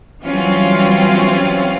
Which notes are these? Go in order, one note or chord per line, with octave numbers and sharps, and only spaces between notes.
E3 F#3 G3 C4 C#4 F4